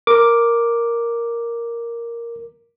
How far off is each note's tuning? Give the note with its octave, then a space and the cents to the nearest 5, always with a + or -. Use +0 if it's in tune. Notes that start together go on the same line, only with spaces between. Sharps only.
A#4 +0 D6 +0